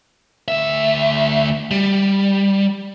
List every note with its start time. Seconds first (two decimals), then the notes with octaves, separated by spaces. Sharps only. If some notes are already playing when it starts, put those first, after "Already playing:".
0.48 D2 E5
1.71 G3